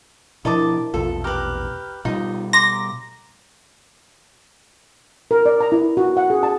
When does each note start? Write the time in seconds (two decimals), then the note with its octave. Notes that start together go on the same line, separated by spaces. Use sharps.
0.45 B2 F3 D4 E4 A#4 D#5 A5 D6
0.94 A#1 E2 B2 F4 A4
1.24 G4 B4 A#5 F6
2.05 B2 G3 D#4 F4
2.53 A#5 C6 D6 A#6
5.31 A#4
5.46 D5
5.61 A#5
5.72 E4
5.97 F#4
6.17 F#5
6.30 G#4
6.43 A5